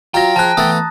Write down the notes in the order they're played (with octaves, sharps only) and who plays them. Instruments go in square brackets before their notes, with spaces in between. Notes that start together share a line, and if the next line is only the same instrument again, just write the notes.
[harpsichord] F#3 F4 [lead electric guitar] G5 [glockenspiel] A#5 A#6
[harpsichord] F3 G#4 [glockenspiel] A5 F#6
[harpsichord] E3 A3 B3 [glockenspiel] D#6 A6